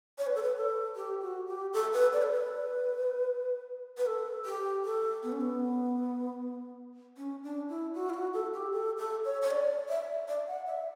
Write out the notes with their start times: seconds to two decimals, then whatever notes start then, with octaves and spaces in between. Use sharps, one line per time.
0.18 C#5
0.27 B4
0.35 A4
0.42 B4
0.57 A4
0.96 G4
1.22 F#4
1.47 G4
1.73 A4
1.93 B4
2.13 D5
2.22 A4
2.32 B4
3.97 B4
4.06 A4
4.45 G4
4.85 A4
5.23 B3
5.32 C#4
5.40 B3
7.18 C#4
7.43 D4
7.69 E4
7.95 F#4
8.10 E4
8.14 F#4
8.33 A4
8.54 G4
8.73 A4
8.98 A4
9.24 C#5
9.42 C#5
9.51 D5
9.89 E5
10.28 D5
10.47 F#5
10.67 E5